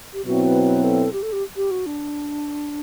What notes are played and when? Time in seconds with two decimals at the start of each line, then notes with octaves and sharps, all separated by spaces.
0.14 G4
0.25 B2 F#3 C4 E4 F#4
0.45 B4
0.64 B4
0.84 A4
1.13 G4
1.23 A4
1.33 G4
1.57 G4
1.71 F#4
1.86 D4